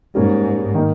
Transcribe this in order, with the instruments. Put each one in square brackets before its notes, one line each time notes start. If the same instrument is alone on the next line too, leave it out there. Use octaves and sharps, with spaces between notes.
[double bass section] G#2 [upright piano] G3 A#3 C#4
[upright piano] D#3 A#3 D#4